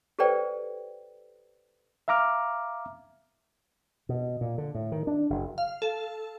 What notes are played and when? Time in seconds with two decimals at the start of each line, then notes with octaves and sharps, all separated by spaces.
0.19 G4 A4 B4 C5 D5 G5
2.08 E5 F5 A#5 D6 F6
4.09 B2
4.41 A#2
4.58 D3
4.75 A2
4.92 D#3
5.07 D4
5.30 F#1
5.58 F5
5.82 A4